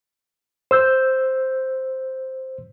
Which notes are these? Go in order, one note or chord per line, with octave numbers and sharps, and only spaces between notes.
C5 E6 G6